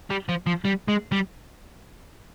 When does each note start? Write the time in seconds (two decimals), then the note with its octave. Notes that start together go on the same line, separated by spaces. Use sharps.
0.11 G3
0.29 F3
0.47 F3
0.65 G3
0.88 G#3
1.12 G3